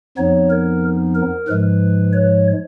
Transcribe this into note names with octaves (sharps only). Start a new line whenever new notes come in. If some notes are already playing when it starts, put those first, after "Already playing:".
F2 F3 B3 D#4 C#5
A#4
A#4
G#2 F3 G#3 B4
C#5